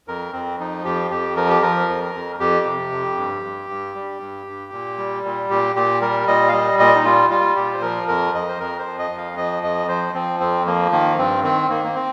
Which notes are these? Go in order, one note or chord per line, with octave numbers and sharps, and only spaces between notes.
F2 A#4
F2 C4
F3 D#4
F2 G4
F2 G4
F3 A#4
G4
F3 A#4
F2
F2
F2 G4
C3
F2
G2
G2
G2
G3
G2
G2
A#2
G3
A#2
A#2 G4
A#2 G4
G3 A#4
A#2 D#5
F5
G3 D#5
A#2 D#5
D#4
G3 F4
G3 F4
A#2 G4
C5
F3 A#4
F2 A#4
F2 D#5
C5
F2 A#4
C5
F3
D#5
F2
F5
F3 D#5
F2 D#5
F3 C5
F3 C4
F2 C4
F3 A#3
D#3 A#3
G2 C4
D#3 C4
D#3 A#3
A#3
C4